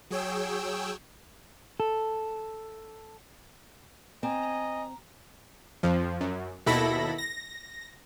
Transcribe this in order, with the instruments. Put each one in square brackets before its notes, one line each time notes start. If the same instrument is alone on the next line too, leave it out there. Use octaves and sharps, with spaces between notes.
[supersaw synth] F#3 G#4 C#5 G5 E6
[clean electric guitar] A4
[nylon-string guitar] C4 [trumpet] D#5 [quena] G#5 [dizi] A#5
[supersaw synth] F2 F3
F#2
D#2 B2 E4 A4 B5 A#6
A#6